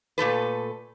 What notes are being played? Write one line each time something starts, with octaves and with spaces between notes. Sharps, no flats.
A#2 A3 A4 B4